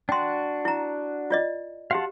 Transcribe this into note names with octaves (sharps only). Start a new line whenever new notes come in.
D4 F#4 G5 C6
E4 A#5
F4 D5 D#5
F#4 G4 F5 F#5 A5